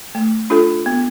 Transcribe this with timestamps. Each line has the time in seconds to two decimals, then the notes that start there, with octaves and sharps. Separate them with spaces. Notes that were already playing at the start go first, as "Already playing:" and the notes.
0.15 A3
0.50 D4 F4 A4
0.86 B3